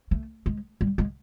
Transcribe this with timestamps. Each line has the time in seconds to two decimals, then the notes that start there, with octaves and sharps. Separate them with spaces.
0.11 A3
0.46 G#3
0.81 G3
0.98 G#3